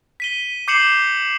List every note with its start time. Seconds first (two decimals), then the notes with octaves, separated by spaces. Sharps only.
0.20 B6 D#7 G7
0.68 D6 G6 C7 C#7 E7 F#7